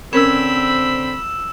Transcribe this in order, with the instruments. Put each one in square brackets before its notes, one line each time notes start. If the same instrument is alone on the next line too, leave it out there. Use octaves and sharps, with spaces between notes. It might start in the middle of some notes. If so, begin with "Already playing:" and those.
[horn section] D3 C4 [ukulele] C#4 A#4 C#5 [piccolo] B5 [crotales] E6 E7